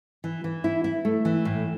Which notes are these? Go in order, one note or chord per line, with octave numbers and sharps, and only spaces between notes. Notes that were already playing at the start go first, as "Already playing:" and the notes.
E3
E3
E4
E4
A3
E3
A2